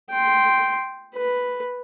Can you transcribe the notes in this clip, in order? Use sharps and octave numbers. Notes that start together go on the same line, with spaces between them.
G5 C6
B4